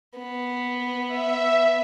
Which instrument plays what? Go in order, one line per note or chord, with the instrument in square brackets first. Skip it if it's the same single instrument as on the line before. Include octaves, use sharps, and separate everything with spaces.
[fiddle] B3
[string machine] E5